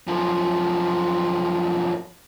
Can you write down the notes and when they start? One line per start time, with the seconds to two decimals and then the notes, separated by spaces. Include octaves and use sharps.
0.07 F#2 F3